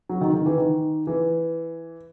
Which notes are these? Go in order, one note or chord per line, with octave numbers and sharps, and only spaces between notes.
F#3
D#3
D#3
E3
D#3
E3